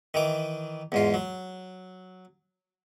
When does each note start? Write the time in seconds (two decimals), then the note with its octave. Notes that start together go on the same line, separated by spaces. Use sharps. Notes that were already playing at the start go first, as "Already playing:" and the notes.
0.14 D#3 E3 D6
0.92 E2 G#2 F4
1.14 F#3